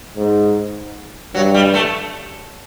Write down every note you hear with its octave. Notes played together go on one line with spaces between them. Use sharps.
G#2
G2 F#3
G3
A3